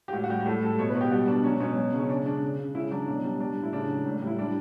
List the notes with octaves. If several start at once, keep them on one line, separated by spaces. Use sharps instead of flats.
G4
A2 F#4
F#4
G3 G4
G4
A2 A4
G3 A4
B2 C#5
B4
B2
G4
G3 F#4
B2 D4
F#3 C#4
B2 C#4
F#3
C#3
C#4
C#3 D4
C#3 D4
C#3
C#3
C#3 E4
F#3 D4
B2 D4
G3 D4
G3 D4
A2
E4
C#3 D4
F#3
A2
G3
E4
G3 D4